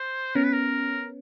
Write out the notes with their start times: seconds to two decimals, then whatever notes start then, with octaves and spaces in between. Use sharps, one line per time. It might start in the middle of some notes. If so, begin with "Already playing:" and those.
Already playing: C5
0.35 B3 C#4 A#4
0.44 B4
0.53 A#4